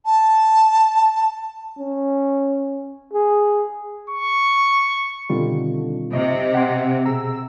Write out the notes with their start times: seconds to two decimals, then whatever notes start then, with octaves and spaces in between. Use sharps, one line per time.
0.06 A5
1.79 C#4
3.13 G#4
4.10 C#6
5.30 B2 D3 D#3 G3 C4 D#4 F4
6.13 C3 D#5
6.54 F#5 G5 C6 G#6
7.06 B2 G#4 A#5 E6